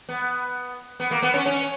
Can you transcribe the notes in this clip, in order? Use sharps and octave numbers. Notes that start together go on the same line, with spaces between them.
B3
B3
A#3
B3
C#4
C#4